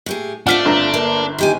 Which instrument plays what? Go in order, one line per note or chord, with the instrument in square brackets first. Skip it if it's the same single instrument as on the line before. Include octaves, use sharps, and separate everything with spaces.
[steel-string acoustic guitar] A2 G4 G#4
[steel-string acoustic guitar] A3 C4 F4 [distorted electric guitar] D4 [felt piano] F#5 F6 B6
[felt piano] G1 D3 A#5
[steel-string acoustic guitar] A#3
D#3 G4 G#5